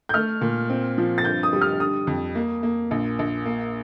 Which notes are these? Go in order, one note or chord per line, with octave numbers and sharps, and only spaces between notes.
G6
A3 F6
A#2
C4
F3
A6
G2 G6
D#6
G3
F6
D3 D#6
F2
A#3
A#3
A#1
A#1
A#3